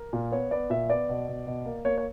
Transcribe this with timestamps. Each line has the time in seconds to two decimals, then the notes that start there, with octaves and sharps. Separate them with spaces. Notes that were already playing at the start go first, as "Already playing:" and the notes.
Already playing: A#4
0.13 A#2
0.32 B3 C#5
0.51 B3 D5
0.70 A#2 E5
0.89 B3 D5
1.09 B2
1.28 B2
1.47 B2
1.65 A#3
1.85 A#3 C#5
1.98 C#5